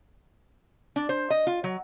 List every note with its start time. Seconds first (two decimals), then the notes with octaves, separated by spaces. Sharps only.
0.96 D4
1.09 C5
1.30 D#5
1.47 F4
1.64 F#3